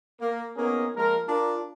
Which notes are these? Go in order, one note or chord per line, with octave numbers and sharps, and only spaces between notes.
A#3
A#3 B3 C#4 D#4 G#4 A#4
F3 G#3 A#3 A#4
D4 F4 A#4 D5